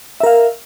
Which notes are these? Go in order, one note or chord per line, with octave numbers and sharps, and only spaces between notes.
A#4 E5 F5